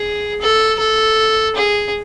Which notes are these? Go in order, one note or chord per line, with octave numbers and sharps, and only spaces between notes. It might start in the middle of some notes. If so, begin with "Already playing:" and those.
Already playing: G#4
A4
A4
G#4